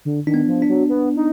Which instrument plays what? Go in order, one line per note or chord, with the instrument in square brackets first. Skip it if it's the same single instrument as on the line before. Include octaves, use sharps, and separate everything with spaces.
[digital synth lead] D3
[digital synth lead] D#3 [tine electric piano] D4
[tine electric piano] B3
[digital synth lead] F3
[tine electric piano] D4
[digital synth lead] F#3
B3
D#4